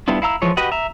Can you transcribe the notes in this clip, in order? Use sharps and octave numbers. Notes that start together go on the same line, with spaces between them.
G3 B3 D4 E4 F4
E4 F5 A#5 E6
E3 F3 G#3 C#5
F#4 G4 B4 D#5 F#5
E5 A#5